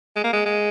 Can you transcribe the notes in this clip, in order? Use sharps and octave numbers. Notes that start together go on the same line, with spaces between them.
G#3
A#3
G#3
G#3